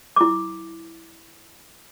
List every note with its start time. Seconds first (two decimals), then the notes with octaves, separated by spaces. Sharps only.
0.16 E4 D6